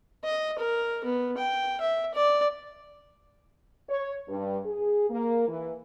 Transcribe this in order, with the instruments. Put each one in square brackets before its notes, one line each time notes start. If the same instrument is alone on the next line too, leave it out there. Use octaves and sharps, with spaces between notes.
[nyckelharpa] D#5
A#4
B3
G5
E5
D5
[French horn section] C#5
G2
G#4
A#3
E3